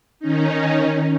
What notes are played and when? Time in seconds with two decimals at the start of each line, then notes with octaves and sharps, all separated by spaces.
0.20 D#3 C#4 D#4